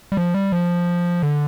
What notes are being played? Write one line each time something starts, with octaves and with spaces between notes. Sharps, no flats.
G3
F3
G3
F3
D3